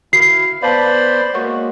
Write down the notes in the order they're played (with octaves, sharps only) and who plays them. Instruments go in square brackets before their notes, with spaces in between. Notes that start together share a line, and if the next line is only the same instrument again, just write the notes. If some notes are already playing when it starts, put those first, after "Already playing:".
[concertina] E4 F5 [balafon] F#4 [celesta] C7
[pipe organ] B3 B4 C6 [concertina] C5 D5 B5 [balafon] F5 A5
[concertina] G#3 [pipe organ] A#3 F#4 [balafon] C#5 C#6